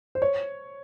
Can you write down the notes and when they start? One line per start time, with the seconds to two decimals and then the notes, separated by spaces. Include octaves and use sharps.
0.15 C5
0.22 C#5